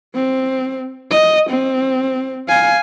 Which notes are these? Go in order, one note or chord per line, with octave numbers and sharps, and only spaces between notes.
C4
D#5
C4
F5 G#5